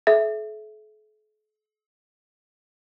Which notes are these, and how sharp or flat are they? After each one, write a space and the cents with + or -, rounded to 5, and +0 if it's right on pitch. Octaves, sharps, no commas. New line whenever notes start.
A4 -45 E5 +0